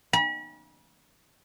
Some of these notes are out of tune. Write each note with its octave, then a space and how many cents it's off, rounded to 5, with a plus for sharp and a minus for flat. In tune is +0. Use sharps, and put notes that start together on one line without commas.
B5 -40